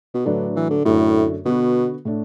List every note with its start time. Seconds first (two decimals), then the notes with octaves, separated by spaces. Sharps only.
0.14 B2
0.26 A2 D3 F#3 D4 B4 D5
0.56 E3
0.70 D3
0.85 F#2 A2 D3 A3 D4 F#4
1.45 B2 D3 B3 F#4
2.05 A2 A3 D4